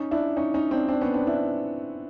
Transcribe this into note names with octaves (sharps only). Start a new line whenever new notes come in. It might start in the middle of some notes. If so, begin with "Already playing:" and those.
Already playing: C#4 D#4
D4 E4
C#4 D#4
C#4 D#4
C4 D4
C4 D4
B3 C#4
C4 D4
D4 E4